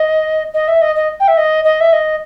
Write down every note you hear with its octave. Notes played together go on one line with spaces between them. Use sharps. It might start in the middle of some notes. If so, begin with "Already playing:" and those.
Already playing: D#5
D#5
E5
D#5
D#5
G5
E5
D#5
D#5
E5
D#5